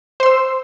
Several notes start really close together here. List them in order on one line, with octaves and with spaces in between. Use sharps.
C5 C6 E6